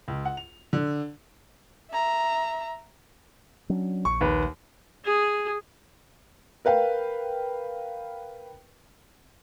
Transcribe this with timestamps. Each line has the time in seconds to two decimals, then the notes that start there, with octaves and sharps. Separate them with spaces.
0.08 C#2
0.25 F#5
0.37 F7
0.73 D3
1.91 E5 A#5
3.69 F#3 C#4 D4
4.05 A#1 C#6
4.21 D#2 B4
5.04 G#4
6.65 A#4 B4 F5 G5